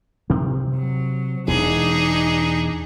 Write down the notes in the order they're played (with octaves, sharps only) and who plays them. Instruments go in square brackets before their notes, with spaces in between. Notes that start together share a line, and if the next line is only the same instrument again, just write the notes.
[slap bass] C3 C4
[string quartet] F#3
[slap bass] E1 E2 [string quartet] D4 D#4 G#4